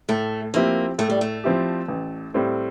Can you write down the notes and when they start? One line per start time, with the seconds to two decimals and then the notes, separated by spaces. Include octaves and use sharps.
0.09 A2 A3
0.54 F3 A#3 C4 E4 G4
0.99 A2 A3
1.10 G3
1.21 A3
1.44 F3 C4 E4 G4
1.88 A1
2.34 A2 G3 C4